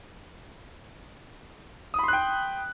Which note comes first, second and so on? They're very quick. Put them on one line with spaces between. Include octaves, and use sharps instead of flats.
D#6 B5 C6 F#6 G5